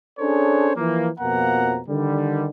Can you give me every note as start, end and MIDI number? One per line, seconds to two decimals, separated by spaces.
0.19 0.71 61
0.19 0.71 62
0.19 0.71 68
0.19 0.71 69
0.19 0.71 72
0.19 0.71 73
0.76 1.09 52
0.76 1.09 53
0.76 1.09 58
1.20 1.80 41
1.20 1.80 47
1.20 1.80 53
1.20 1.80 58
1.20 1.80 78
1.20 1.80 82
1.88 2.48 50
1.88 2.48 51
1.88 2.48 55